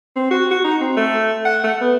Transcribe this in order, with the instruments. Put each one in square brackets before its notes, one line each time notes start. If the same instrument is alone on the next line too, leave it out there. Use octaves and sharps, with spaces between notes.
[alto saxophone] C4
F#4
F#4
D#4
C4
A3
F#5
A3
B3